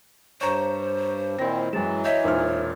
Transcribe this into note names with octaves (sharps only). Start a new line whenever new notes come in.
G2 C5 C#5 A#5 C#6 G6 E7
A#2 D#3 C4 E4 A#6
F#2 E3 F#3 G#3 G5 A6 E7
C#5 D#5 E5 G6 B6
E1 A#2 D#4 C5 E5 F6